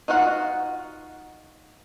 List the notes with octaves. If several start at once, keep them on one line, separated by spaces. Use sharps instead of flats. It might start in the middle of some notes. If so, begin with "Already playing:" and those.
D#4 F4 F#4 F#5